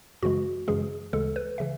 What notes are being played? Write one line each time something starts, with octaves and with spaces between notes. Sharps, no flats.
F#2 C#3 E3 G#3 F#4
F#2 C#3 E3 G#3 G#4
D2 C#3 E3 G#3 A4
B4
C#3 E3 E5